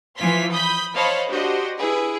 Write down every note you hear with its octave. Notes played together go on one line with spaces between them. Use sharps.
E3 F3 F4 G#5 C6 B6
B5 D#6 G6 B6
C5 C#5 D#5 F5 A5 B5
D4 F#4 G4 C5 D#5
E4 G#4 B4